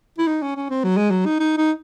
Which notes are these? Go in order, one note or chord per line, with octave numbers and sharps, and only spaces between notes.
E4
D#4
C#4
C#4
C4
F#3
G#3
F#3
D#4
D#4
D#4